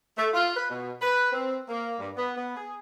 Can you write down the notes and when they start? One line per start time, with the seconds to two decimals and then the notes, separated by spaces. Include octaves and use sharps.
0.18 A3
0.33 F4
0.55 B4
0.70 B2
1.02 B4
1.33 C4
1.68 A#3
1.99 G2
2.16 B3
2.36 B3
2.57 G#4